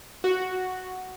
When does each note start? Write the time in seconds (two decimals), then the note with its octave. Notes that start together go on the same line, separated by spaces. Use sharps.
0.24 F#4